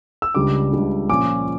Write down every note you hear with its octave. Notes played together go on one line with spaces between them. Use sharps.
E6
C#2 C#3 G3 D4 D6
C#2 C#3 G3 D4
A#2 F3 C#4 D6